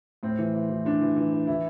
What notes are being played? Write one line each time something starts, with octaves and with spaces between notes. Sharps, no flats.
A2 C4
E3
E3
E3
E3 D4
E3
E3
E3
E3 E4